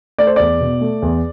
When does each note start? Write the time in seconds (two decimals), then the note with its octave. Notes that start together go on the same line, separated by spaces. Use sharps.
0.18 A3 D5
0.27 C5
0.36 E2 D5
0.61 B2
0.81 A3
1.02 E2